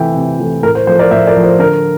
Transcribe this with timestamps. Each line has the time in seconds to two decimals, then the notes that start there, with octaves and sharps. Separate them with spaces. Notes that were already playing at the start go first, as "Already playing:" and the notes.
Already playing: C3 E3 A3 E5 G5
0.15 C3
0.39 E3 A3
0.63 A2 A#4
0.75 C5
0.87 F3 A3 C5
0.99 A#4 D5
1.11 A2 C5 E5
1.27 A#4 D5
1.35 F3 A3
1.43 C5
1.59 D3 A#4